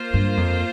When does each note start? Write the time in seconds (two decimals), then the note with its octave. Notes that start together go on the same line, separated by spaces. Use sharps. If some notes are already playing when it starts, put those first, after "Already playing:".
Already playing: A#3 F4 C5
0.14 G2
0.37 F2